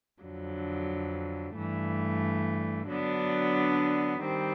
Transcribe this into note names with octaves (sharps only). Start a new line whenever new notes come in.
F2 D3 F#3
G2 E3 A3
D3 F#3 B3 D4
D#3 G3 C4